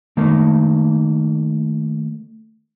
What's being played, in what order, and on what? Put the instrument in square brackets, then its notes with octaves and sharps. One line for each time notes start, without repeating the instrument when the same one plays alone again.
[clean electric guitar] D#3 A3 A#3